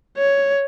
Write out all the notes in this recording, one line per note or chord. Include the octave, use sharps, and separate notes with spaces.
C#5